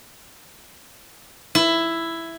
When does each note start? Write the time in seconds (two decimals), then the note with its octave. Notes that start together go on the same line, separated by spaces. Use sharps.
1.55 E4